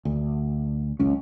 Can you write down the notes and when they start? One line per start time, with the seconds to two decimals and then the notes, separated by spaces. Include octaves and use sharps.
0.05 D2
0.99 F#1 C#2 C#4